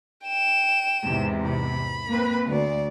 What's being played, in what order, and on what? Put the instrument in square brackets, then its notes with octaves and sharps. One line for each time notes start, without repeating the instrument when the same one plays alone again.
[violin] G5 E7
[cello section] E2 G#2 C3
[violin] B5
[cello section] A#3 C4 B4
[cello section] D2 [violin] D5